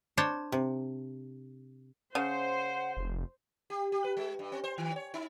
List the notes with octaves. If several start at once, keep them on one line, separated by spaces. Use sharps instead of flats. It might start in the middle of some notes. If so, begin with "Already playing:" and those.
D4 C5 C#5
C3
C#3 C5 F#5
F1
G4
G4
B4
G#3
G2
C4
C5
D#3
C#5
D#4